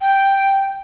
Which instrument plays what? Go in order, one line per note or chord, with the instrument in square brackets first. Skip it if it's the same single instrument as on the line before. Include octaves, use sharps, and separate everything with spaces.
[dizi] G5